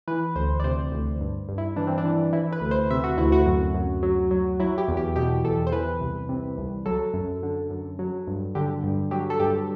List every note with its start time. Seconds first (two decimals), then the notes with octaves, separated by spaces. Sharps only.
0.07 E3 B4
0.36 D2 C5
0.60 D5
0.64 C3 C5
0.92 D2
1.21 G2
1.49 G2
1.58 E4
1.76 E3 D4
1.87 C4
1.98 D4
2.05 E3
2.33 E3 E4
2.53 B4
2.61 D2
2.71 C5
2.91 C3 E5
3.04 F#4
3.18 D2 E4
3.32 F#4
3.46 F#2
3.74 F#2
4.03 F#3
4.31 F#3
4.60 F#3 E4
4.78 G4
4.88 E2
4.97 G4
5.16 B2 G4
5.44 E2 A4
5.67 C5
5.72 E3 B4
6.00 C2
6.29 C3
6.58 C2
6.86 F#3 A4
7.14 F#2
7.43 D3
7.70 F#2
7.99 F#3
8.27 G2
8.55 D3 G4
8.84 G2
9.11 F#3 G4
9.30 A4
9.40 G2 G4